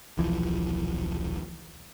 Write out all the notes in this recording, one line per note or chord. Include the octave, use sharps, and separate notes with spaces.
D#1 B1 E3 F3